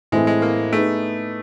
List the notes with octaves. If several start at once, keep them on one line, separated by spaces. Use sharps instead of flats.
A2 E3 G#3 A3 C4
G#3
A#3
A3 B3 D#4 G#4